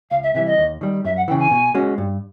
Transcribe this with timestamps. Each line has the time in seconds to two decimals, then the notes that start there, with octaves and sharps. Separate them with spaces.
0.11 C#2 F5
0.23 E5
0.34 C3 E3 G3 E5
0.46 D#5
0.58 D#2
0.81 D#3 G3
1.04 F#2 E5
1.17 F#5
1.28 E3 G5
1.31 C#3
1.39 G#5
1.51 B2
1.74 G#3 C#4 F#4
1.98 G2